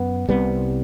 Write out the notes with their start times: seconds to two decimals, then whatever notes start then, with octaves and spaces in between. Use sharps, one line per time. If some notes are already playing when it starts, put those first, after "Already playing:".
Already playing: F#2 B3
0.29 C2 C3 G3 B3